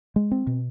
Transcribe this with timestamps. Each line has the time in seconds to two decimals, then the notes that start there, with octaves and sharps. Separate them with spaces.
0.16 G#3
0.31 C4
0.47 B2